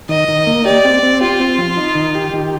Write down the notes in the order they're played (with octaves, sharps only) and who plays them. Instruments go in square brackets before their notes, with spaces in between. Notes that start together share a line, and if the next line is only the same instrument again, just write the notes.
[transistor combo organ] D#3 [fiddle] D#5
[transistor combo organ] D#3
A#3
[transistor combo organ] G4 [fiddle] D5
[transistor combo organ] C4
C4
[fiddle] F4 [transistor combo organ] G4
[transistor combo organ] C4
F3
D#4
D#3
G4
D#3